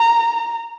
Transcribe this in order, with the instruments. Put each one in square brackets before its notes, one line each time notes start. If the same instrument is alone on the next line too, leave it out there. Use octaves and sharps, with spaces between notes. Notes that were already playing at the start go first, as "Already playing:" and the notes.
Already playing: [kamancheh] A#5